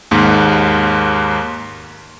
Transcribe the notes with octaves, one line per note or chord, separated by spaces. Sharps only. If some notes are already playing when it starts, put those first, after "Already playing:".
D#2 G#2